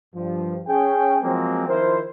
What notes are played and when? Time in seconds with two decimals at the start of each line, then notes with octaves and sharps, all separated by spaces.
0.15 G2 F3
0.68 C#4 G#4 G5
1.22 F3 F#3 G#3 A#3 C4
1.68 D#3 F3 E4 F4 A#4 C5